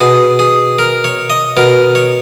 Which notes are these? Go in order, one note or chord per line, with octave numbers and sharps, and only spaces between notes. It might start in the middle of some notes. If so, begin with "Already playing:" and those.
B2 G#4
G#4
A#4
C#5
D#5
B2 A#4
C#5